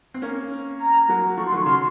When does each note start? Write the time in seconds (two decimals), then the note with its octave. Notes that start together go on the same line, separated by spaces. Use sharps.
0.14 C4
0.22 A#3 C#4
0.80 A#5
1.08 F#3 A#3
1.37 F3 A3 C#6
1.47 C6
1.52 D#3 F#3 C#6
1.66 C#3 C6